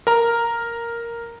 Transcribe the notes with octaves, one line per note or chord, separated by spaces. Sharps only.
A#4 A#5